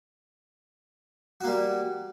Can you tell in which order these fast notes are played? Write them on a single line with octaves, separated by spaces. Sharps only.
F#4 A#3 G3